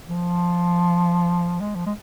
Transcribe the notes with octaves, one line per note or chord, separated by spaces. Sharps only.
F3
G#3
F3
G#3